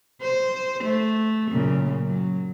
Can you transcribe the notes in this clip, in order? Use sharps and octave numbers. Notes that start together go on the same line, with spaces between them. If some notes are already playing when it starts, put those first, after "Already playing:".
C5
A3
F#2 A#2 C#3
F#3